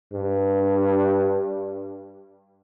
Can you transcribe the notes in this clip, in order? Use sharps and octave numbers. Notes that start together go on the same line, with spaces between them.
G2